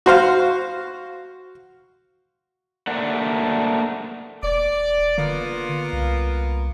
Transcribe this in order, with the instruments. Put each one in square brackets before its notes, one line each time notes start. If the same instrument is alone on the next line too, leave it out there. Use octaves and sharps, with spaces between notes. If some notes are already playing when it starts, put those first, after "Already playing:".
[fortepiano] F#4 C5 F5
[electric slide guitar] A3 A#3 D4 D5 F#5
[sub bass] E1 [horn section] D5
[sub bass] D3 [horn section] A#3 B3 F4
[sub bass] C2